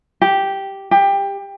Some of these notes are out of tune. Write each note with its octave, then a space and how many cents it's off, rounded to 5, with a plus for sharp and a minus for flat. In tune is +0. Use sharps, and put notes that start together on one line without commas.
G4 -5
G4 +20